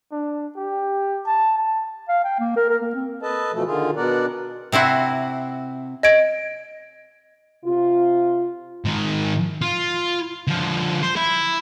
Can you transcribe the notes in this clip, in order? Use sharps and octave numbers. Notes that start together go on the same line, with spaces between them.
D4
G4
A5
A5
F5
G5
A#3
A#4
A#4
A#3
C4
A4 B4 D#5 A5
B2 E3 F3 A3 A4
D3 D#3 F4 G#4
B2 B3 D4 A#4 D5 F#5
C3 C4 E4 F#4
D#5 G#6 D7
C3 F4
G#2 D#3
F4
D3 F3
C5
E4